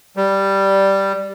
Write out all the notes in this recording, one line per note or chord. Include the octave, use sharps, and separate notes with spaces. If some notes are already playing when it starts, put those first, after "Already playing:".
G3